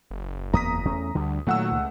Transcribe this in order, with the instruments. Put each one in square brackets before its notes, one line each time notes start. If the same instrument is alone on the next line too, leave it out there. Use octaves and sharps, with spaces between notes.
[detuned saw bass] F#1
[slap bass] E2 A#3 [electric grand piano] A#5 D#6 B6
[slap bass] E2 A3 C#4
[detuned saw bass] D2 [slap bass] D3 G3
[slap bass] A#2 D#3 [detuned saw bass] F#3 [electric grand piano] A3 F#5 E6
[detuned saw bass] C#2